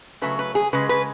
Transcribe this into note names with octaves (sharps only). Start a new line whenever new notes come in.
C#3 F#3 A3 B4
B4
G#4
C#3 G#3 B4
B4